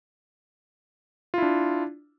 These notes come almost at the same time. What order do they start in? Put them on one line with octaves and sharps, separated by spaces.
F4 E4 D4